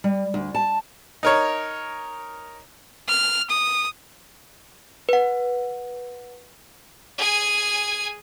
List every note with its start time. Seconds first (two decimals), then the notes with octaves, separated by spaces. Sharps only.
0.04 G3
0.34 D2
0.55 A5
1.23 D#4 A#4 C#5
3.09 F6
3.50 D#6
5.09 B4 F#5
7.18 G#4 G#5